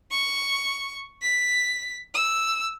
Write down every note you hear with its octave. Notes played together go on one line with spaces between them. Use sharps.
C#6
B6
E6